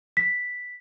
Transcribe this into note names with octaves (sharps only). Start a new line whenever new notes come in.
B6